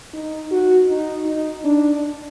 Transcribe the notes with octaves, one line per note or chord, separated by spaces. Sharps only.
D#4
F#4
D#4
D#4
D4